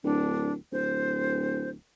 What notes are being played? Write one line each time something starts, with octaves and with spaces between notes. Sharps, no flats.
D1 D4
D1 C5